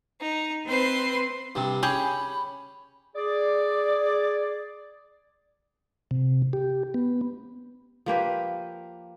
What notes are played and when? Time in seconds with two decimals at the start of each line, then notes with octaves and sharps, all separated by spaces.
0.21 D#4
0.66 C4 B4 C5 C6
1.55 G2 C3
1.83 C#4 G4 G#4 B5
3.15 G#4 D5
6.11 C3
6.53 G4
6.94 B3
8.06 F3 A#3 G4 B4